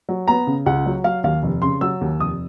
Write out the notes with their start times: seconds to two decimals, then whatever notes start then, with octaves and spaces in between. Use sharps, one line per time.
0.09 F#3
0.28 B3 A#5
0.47 C#3
0.66 C#2 F#5
0.86 F#3
1.04 F#3 F5
1.24 D#2 F5
1.43 F1
1.62 C#3 C6
1.81 F#3 E6
2.01 D#2
2.20 F1 D#6